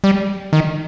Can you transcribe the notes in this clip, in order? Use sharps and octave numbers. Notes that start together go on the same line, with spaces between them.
G3
D#3